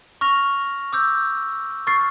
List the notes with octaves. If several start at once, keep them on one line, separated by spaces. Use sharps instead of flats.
C#6 F6 A#6 F7
D6 E6 G6
C#6 F6 A6 C7